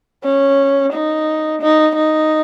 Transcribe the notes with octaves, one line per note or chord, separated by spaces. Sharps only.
C#4
D#4
D#4
D#4